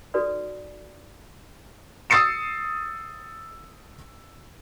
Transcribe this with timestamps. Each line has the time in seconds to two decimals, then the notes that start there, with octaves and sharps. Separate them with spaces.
0.14 D#4 F#4 A4 B4 D5 D#6
2.10 D#6 E6 A6 C7 C#7 E7